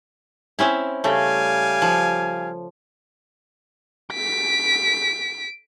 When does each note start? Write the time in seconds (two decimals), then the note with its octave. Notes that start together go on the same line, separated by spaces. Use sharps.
0.59 C4 C#4 E4
1.04 C#3 G3 A3 F5 G#5
1.82 F3
4.14 B6 D7